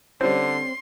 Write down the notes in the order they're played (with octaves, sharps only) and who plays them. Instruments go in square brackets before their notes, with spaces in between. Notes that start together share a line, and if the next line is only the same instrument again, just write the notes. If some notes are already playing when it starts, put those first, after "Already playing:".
[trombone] D3 [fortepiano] G3 C#4 [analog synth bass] C4 [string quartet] C6